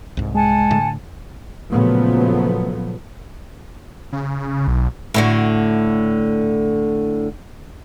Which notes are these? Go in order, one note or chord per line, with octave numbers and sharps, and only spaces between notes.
C2 G#2
G#3 F#5 G#5 A5
A2 D3
A#2 C#3 F3 F#3 A3 B3
C#3
B1
A2 D3 F#4